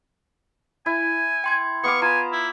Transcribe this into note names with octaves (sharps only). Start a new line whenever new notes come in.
E4 G#5
G5 C6 G#6
B3 F5 C#6 D6
F4 G#5 A#5 B5
E4